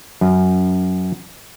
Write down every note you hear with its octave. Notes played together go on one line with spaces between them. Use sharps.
F#2